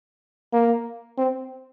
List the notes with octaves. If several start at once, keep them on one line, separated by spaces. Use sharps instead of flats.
A#3
C4